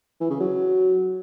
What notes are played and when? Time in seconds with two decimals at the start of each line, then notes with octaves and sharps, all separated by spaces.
0.20 E3
0.30 C#3
0.40 F#3